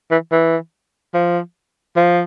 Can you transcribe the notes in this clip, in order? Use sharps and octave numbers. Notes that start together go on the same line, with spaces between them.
E3
E3
F3
F3